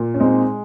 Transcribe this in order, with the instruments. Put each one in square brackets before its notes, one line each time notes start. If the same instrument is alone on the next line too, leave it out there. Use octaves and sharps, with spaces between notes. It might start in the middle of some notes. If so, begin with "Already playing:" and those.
Already playing: [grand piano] A#2
[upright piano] C#4
[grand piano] G#3 [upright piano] C4 D#4